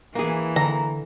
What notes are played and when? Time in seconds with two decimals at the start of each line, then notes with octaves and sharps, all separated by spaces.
0.15 E3 A#3 G#4
0.56 D3 A#5